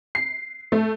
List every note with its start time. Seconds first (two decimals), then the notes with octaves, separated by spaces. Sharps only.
0.15 C7
0.72 A3